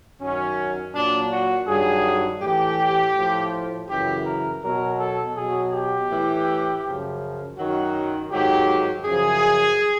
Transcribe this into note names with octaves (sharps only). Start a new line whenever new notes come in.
F#2 D#3 F#3 C#4
A#2 F#3 D4
F#4
G2 D#3 F#3 G#4
A2 E3 G4
A2 F3
F#2 C#3 E3 G4
A#4
B2 F#3 A#4
A4
B2 F#3 G#4
G4
A2 E3
F#2 C#3 F3
F#2 D#3 F#3 F#4
G#2 D#3 F#3 G4
F#2 C#3 F3 G#4